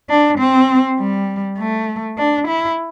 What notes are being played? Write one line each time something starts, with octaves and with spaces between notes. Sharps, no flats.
D4
C4
G3
A3
D4
E4